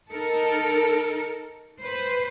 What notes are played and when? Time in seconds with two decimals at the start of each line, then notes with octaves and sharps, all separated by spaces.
0.10 D#4 A4 A#4
1.81 B4 C5